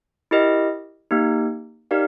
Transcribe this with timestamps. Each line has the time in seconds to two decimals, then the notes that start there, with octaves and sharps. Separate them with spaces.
0.31 E4 G4 A#4 D#5
1.11 A#3 D#4 G4
1.91 D#4 G4 A#4 D5 F5